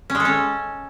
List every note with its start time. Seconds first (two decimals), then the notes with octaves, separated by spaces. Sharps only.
0.10 C#4
0.15 G#3
0.20 A4
0.25 C#4